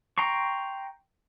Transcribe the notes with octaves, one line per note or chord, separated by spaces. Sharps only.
G5 A#5 C6 C#6